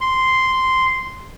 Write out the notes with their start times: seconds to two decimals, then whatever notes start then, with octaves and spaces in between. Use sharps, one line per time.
0.01 C6